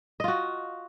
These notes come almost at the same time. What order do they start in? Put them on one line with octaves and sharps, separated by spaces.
D#5 F4 F#4